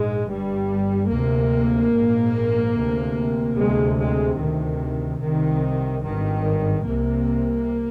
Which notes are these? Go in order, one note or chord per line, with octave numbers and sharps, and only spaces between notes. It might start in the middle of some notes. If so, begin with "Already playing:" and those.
Already playing: A#1 G#2 G#3
G1 G2 G3
D2 C3 A#3
A#1 G#2
D2 C3
D2 C3 G#3
G#3
D2 C3 D#3
C2 C3 D#3
G#1 G2 D#3
C2 C3 A#3